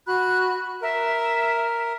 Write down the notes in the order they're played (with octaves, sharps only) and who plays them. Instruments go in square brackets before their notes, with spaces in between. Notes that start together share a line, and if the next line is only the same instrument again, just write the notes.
[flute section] F#4 B5 F#6
[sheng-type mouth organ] A#4 [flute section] E5